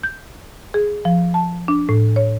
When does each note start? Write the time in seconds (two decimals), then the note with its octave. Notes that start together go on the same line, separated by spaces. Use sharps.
0.03 G6
0.74 G#4
1.05 F3
1.34 A5
1.68 D4
1.89 A2
2.16 C#5